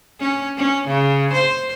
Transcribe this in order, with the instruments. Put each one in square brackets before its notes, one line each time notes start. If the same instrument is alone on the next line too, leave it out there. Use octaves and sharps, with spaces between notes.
[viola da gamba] C#4
C#4
C#3
C5